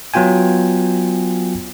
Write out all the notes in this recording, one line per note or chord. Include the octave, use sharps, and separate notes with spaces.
F#3 B3 F4 G5 G#5